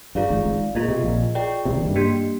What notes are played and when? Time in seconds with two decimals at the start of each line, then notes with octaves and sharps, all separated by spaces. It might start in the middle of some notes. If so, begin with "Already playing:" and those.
0.15 G2 F4 G#4 D5 F5
0.30 G#1 G#2
0.45 G#1 G#2
0.75 A#2 F4 G#4 D#5
0.89 C3
1.02 A#1 A#2
1.35 F4 G#4 D5 G5
1.65 C2 C3
1.75 D#2 D#3
1.86 G2 G3
1.96 A#3 D4 G4